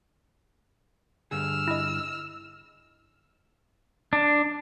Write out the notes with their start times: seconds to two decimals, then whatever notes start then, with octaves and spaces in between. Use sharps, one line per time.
1.31 G2 D3 G#4 E6 F6
1.68 E4 D#5
4.13 D4